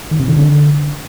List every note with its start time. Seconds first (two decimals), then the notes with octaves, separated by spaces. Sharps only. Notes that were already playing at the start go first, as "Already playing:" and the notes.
0.11 D#3
0.20 C3
0.28 D#3
0.37 D3